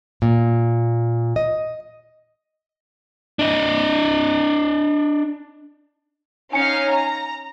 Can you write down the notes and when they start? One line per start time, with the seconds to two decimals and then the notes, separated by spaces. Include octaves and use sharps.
0.22 A#2
1.36 D#5
3.39 D4 D#5
6.53 C#4 D#4 F5 G#5 C#7
6.89 A#5